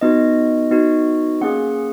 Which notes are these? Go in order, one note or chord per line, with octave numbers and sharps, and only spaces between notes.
B3 D#4 F#4 D#5
B3 D#4 F#4
A#3 C#4 G#4 F#5